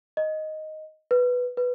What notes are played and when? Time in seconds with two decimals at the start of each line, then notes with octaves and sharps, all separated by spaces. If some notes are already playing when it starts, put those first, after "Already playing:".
0.17 D#5
1.11 B4
1.57 B4